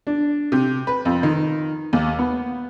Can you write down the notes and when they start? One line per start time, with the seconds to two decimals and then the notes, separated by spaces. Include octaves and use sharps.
0.07 D4
0.52 C3
0.87 B4
1.05 F2
1.23 D#3
1.93 D#2
2.19 B3